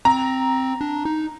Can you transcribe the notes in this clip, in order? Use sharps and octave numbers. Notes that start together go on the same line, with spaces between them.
C4 A#5
D4
D#4